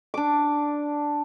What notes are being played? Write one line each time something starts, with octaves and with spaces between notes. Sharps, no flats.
D4 D6